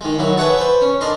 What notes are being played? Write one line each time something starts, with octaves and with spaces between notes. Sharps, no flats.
D#3 G#3
D#3 F#3 E4
G#4 B4 C#5 E5 F#5 A5
B4 C5
C#4
D4 A#4 D#5 C6